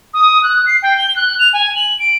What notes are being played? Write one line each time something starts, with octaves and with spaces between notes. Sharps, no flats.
D#6
F#6
C7
G5
G7
F#6
F7
G#5
F#7
D7